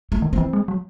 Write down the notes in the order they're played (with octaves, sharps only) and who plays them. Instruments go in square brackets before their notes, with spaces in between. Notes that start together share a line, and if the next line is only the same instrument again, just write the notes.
[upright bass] A3
[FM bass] D#3
[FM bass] E3 [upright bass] C4
[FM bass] G#3
F#3